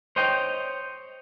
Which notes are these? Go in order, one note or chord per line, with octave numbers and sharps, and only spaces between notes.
C5 C#5 D#5 G5